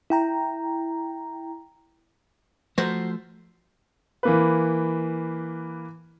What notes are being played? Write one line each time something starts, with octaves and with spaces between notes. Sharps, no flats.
E4 G5 A#5
F3 F#3 A3 C5
E3 A#3 B4